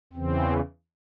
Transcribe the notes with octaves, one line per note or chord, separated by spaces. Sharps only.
E2 C#3 E3 C4